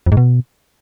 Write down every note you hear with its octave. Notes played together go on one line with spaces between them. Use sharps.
F2
G#2
B2